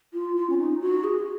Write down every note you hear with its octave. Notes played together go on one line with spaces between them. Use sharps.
F4
F4
C#4
D#4
F#4
G#4